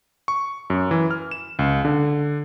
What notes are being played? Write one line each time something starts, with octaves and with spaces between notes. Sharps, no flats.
C#6
F#2
E3
F6
E7
C#2
D3